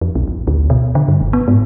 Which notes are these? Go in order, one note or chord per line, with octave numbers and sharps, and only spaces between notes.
F2
B1
A1
D2
B2
D3
G2
F#1
B3
G#2